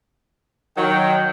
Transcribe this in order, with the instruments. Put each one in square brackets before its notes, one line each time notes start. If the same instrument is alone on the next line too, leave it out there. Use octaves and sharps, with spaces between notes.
[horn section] D#3 F#3 [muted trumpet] G5